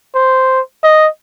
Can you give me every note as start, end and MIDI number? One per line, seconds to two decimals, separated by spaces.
0.15 0.61 72
0.84 1.08 75